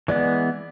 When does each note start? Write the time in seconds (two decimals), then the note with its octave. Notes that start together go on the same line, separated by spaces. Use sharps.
0.08 E3 G#3 B3 D5